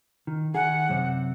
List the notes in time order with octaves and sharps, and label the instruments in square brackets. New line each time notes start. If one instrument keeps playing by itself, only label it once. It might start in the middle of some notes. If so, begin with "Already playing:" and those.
[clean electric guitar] D#3
[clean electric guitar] D#3 G#4 [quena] F#5
[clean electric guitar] F#2 C3 C4